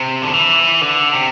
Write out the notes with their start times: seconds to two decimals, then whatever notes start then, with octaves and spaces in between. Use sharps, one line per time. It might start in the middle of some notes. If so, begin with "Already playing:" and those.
Already playing: C3
0.22 D3
0.34 E3
0.81 D3
1.13 C3